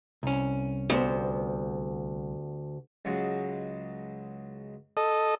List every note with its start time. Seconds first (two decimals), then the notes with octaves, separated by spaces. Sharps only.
0.23 C2 C#4
0.90 D2 G3 B3 C5
3.05 C#2 F#3 G#3
4.97 A4 D#5